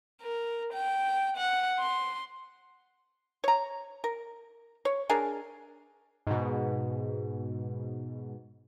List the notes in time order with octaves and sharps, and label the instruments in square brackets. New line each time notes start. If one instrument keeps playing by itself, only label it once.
[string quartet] A#4
G5
F#5
C6
[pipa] C#5 A#5
A#4
C#5
D4 G#4 A#4
[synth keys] G#2 B2